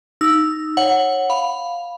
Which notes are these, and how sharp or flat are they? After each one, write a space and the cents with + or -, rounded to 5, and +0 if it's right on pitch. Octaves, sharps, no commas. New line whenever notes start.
D#4 +0 E6 +0
C#5 -15 F#5 +0
F5 +0 B5 +0